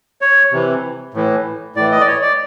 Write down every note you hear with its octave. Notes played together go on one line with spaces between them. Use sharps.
C#5
C3 E3
A2 E3
A2 E3 D5
D#5
D5
C#5
D5